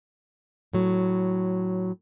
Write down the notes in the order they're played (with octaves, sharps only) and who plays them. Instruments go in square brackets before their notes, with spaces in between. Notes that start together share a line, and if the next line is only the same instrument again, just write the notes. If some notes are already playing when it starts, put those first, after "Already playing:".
[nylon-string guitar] A2 F#3